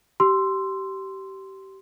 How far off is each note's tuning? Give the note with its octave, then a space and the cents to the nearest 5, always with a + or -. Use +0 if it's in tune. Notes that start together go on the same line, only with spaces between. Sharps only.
G4 -25 C6 -5 E6 +15